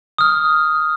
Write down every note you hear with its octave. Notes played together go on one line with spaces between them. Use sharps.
D#6 F6